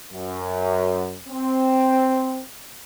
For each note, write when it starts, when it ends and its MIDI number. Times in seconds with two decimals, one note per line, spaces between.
0.13 1.16 42
1.29 2.41 60